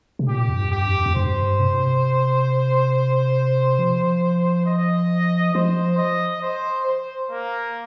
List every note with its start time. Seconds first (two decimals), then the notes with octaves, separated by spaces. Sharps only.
0.19 C3
0.28 A#2 G4
0.49 F2
0.57 G2
0.72 G4
0.86 F2
1.06 F2
1.15 G2 C5
1.60 C3
3.79 F3
4.66 D#5
5.55 F3 C5
5.98 D#5
6.42 C5
6.86 C5
7.31 A#3